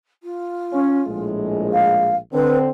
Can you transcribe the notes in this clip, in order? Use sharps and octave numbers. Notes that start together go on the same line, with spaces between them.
F4
C#4
A#1 A2 G#3
F5
D3 C4 B4